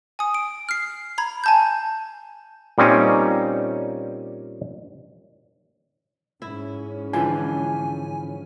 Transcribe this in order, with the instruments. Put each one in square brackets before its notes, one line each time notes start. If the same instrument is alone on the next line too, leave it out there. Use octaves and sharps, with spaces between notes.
[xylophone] G#5 D#6
D7
F6 C7
A#5 B5 G#6
G#5 A5 G6
[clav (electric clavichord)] A#2 G3 C4 C#4 D#4
[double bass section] G#2 C#4 [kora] E4
[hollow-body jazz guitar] D3 E3 [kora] F3 B4 [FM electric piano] G#5